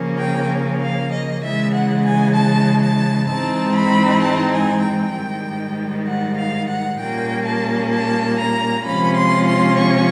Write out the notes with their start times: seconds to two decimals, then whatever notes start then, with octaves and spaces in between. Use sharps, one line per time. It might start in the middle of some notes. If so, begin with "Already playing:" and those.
Already playing: C#3 F3 A#3 C#4
0.19 G5
0.81 F5
1.12 D#5
1.44 C#3 E3 G#3 E5
1.74 F#5
2.05 G#5
2.36 A5
2.82 A5
3.29 G#2 E3 G#3 C4 D#4 A5
3.76 B5
4.21 A5
4.53 G#5
4.84 G5
5.15 G#2 D#3 G3
6.07 F#5
6.38 F5
6.69 F#5
7.00 A#2 G3 A#3 C#4 G5
7.47 A5
7.93 A5
8.39 A#5
8.86 C3 F3 G#3 C#4 F4 B5
9.17 C6
9.47 C6
9.78 C#6